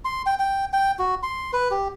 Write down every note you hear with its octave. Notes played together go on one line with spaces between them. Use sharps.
C6
G5
G5
G5
F#4
C6
B4
G4